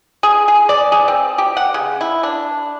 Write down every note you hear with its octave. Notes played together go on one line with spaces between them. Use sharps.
G#4
G#4
D5
G#4
C4
G4
F#5
C#3
E4
D4